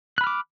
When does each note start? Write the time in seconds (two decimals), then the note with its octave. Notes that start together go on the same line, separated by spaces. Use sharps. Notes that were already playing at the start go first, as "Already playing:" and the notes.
0.18 F#6
0.21 B5
0.24 F6
0.27 D6